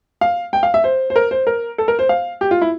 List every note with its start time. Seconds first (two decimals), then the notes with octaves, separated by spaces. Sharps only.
0.21 F5
0.53 G5
0.63 F5
0.74 E5
0.84 C5
1.10 C5
1.16 A#4
1.31 C5
1.47 A#4
1.78 A4
1.88 A#4
1.99 C5
2.09 F5
2.41 G4
2.51 F4
2.61 E4